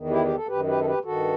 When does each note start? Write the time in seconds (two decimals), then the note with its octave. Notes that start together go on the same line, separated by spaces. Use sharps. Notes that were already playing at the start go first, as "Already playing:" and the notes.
Already playing: E2 D#3
0.09 E4 G4
0.24 G4
0.36 A4
0.47 F#2 D#3 G4 B4
0.66 G4 B4
0.81 A4
0.85 G4 B4
1.04 G2 D#3 F#4 A4